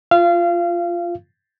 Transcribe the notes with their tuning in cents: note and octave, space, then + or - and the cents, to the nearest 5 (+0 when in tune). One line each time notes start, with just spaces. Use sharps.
F4 -5 F5 -25